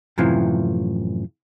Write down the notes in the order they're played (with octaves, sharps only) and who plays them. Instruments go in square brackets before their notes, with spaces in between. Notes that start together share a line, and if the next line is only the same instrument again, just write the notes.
[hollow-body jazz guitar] F#2 A2 C3 E3 F3